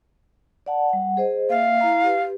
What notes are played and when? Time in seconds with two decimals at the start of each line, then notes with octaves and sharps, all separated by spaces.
0.66 D5 F#5 A5
0.89 G3 F#5
1.17 G#4 C5 D#5
1.50 A#3 E5 F5
1.81 E4 A#5
2.04 G4 B4